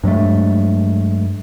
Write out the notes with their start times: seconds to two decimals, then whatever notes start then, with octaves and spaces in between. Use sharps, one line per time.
0.03 G2 F#3 G#3 A3